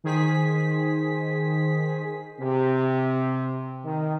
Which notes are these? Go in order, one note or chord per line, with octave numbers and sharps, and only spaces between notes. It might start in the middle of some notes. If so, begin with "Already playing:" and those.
D#3 G#4 C5 B6
C3
D#3